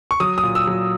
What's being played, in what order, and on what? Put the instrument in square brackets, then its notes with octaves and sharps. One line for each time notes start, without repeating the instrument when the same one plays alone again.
[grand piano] C#6
F#3 D#6
D#6
A#2
E6
F#3